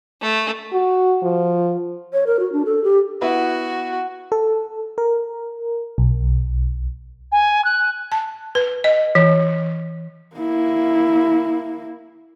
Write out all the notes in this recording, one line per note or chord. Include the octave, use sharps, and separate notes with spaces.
A3
F#4
F3
C#5
A#4
F#4
D4
A4
G4
B3 E4 F#4 B4
A4
A#4
B1
G#5
F#6
A5
B4
D#5
E3
A#3 E4